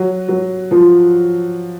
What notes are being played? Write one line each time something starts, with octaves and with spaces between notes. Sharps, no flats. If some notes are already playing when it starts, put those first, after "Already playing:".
Already playing: F#3
F#3
F3